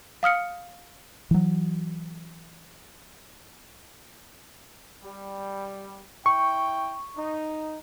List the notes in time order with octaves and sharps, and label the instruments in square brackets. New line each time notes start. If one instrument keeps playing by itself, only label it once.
[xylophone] F5 D#6 F6 C#7
[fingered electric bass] E3 F#3
[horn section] G3
[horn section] E4 G5 [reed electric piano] C#6
[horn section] D#4